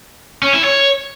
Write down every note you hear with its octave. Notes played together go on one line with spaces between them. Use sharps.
C#4
E4
C#5